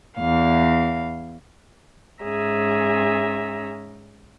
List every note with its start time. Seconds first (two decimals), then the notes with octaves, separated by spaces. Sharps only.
0.18 E2 F5
2.23 G#2 C#4 G#4 E5 A#5